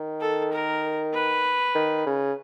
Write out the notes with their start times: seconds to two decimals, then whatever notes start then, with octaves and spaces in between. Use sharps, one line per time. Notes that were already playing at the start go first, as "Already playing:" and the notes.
Already playing: D#3
0.21 A4
0.52 A#4
1.14 B4
1.75 D#3
2.06 C#3